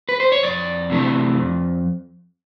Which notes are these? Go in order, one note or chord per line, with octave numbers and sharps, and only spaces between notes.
B4
C5
C#5
F2 D5
C3 E3 A3 D4
F2